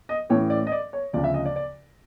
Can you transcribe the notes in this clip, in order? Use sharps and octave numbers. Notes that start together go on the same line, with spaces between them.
D#5
A2 E3 A3 C#4 C#5
D5
D#5
D5
C#5
D2 C#3 F3 D5
E5
D#5
D5
D5